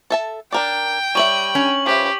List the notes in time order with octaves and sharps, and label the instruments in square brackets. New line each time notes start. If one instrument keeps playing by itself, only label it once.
[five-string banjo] A4 E5 A5
[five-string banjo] D4 A#4 D5 [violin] G5
[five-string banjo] G3 C#5 E5 [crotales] C#6 F#7
[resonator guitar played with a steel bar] C#4
[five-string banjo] F3 B4 E5 [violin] G4